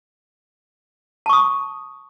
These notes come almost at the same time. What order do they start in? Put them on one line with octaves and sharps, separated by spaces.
A5 C#6 D#6